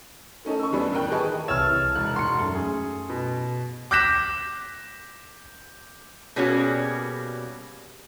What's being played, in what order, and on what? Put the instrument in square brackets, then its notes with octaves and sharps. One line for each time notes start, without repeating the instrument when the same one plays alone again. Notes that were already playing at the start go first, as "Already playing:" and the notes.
[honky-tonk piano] A3 C#4 D#4 A4
C#6 E6
E2 E3 G3 B3 C#4 D4
A1 D#3 A#4 G5 F#6
G4 G#4 B4 D#5 A5 C#6
[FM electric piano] C2 E3 A5 [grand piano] C#5 [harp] E6 F6
[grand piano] E1 [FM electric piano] F#6
[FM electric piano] G#2 F#4 [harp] C6 C#7
[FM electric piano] F#2 A3
[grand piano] G#4
B2
D6 F#6 G6 A#6 B6 E7
[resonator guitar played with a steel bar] B2 G3 A#3 C#4 F#4 G#4